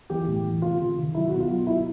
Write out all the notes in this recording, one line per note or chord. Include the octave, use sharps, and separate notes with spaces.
E3 G4
A2
E3
C3 F4
C3
D#3
F#3 E4
B2 F#4
F4
F#3
F#3 E4